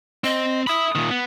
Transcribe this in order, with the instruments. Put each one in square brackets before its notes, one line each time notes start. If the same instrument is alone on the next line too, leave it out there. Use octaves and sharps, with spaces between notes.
[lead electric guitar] C4 [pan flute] D#5
[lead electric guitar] E5 B5 [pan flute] D#6
[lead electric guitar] A#2 D#3
B3